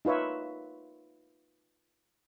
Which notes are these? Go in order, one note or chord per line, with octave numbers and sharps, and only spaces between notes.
D#4 F4 B4 C#5 E5